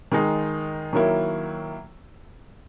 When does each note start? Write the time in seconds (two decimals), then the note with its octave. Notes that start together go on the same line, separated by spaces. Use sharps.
0.12 D#3 G#3 D#4
0.93 D#3 F#3 A#3 E4